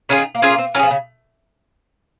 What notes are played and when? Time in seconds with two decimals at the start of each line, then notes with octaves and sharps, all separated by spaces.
0.09 C#3 C#4 F4 G#4
0.18 D#3
0.35 A#3
0.42 C4 C#4 F4 G#4
0.50 A#3
0.58 C4
0.75 F#3 C#4 F4
0.79 F3 G#4
0.91 C#3